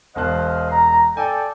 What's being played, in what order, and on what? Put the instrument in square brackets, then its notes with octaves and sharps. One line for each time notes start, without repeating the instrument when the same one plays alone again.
[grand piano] E1 A5 F#6 [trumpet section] C5 D#5 F5
[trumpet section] A#5
[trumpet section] A4 D5 G5 [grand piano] G#5